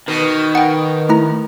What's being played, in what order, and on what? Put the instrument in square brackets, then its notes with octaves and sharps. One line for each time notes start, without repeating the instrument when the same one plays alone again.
[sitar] B2 [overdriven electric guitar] D#3
[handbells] F#5 G5
A3 E4 A#5